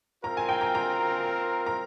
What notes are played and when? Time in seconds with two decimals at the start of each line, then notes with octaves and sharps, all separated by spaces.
0.24 C4 F4 A#4 A#5
0.37 G#5
0.49 G5
0.61 A#5
0.75 A#5
1.66 A#5